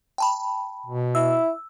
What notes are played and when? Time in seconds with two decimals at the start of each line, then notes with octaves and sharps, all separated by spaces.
0.18 G5 A5 B5
0.86 B2
1.15 E4 E6